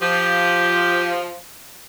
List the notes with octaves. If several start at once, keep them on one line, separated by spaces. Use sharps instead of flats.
F3 G4